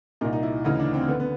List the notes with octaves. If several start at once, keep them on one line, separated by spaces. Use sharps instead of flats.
C2 A#2 D#4
D#4
E4
D2 C#3 E3 D#4
D4
C4
D3 B3
B3